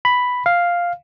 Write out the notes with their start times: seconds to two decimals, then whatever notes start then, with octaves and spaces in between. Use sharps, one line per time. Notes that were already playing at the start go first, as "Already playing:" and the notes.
0.05 B5
0.46 F5